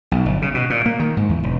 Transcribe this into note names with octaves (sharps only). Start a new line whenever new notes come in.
B1
G1
C#3
B2
A#2
A#3
D#3
G#2
E2
E1